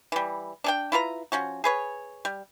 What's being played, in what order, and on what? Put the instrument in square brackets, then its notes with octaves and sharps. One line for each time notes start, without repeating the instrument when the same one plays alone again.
[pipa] E3 G3
D4 G#4 G5
E4 F4 B4 A#5
F3 C#4 F#4
G#4 B4 C#5
G3